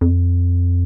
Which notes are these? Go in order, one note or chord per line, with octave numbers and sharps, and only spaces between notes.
F2